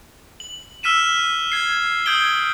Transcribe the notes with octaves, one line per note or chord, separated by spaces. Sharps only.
F#7
E6 F6 B6 D#7 E7
G#6 C7
D#6 G6 G#6 C7 D7 G7